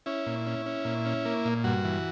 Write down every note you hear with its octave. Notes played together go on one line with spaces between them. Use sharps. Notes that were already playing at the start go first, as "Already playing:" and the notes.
C#4 E4
A#2
C#4
C#4
A#2
C#4
A#3
A#2
G2 F#4
E3